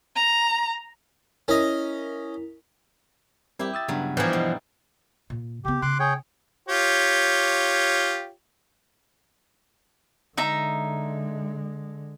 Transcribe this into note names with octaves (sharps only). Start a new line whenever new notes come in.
A#5
C#4 E4 A#4 D#5
G3 C4 E4 G4 A#4
D#6 E6 A6
G2 C#3 F#3 G3 B3
E3 F3 G3 B3 D#4 E4 F#6 G6
B2
A#2
C#3 B3 G4
C#3 C6 D6 F#6
G#4 C#5 G5
F4 G4 C#5
D3 G#3 D#4 E5 A#5